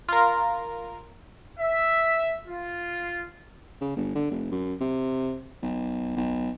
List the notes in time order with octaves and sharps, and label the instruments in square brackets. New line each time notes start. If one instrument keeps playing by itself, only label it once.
[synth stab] F4 A#4
[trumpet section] E5
F4
[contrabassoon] C#3
G1
D3
F1
F#2
C3
B1
B1